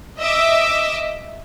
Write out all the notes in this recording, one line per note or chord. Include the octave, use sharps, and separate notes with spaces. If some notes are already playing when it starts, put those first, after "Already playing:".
D#5 E5 D6 E6